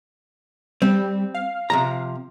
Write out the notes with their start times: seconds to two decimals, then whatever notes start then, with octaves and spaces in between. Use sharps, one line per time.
0.82 G3 C4
1.34 F5
1.70 C3 F3 A#5